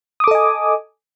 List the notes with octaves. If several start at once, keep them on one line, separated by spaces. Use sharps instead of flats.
A4 D#5 G#5 D6 D#6